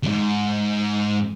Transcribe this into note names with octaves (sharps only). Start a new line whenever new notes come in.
D#2 G#2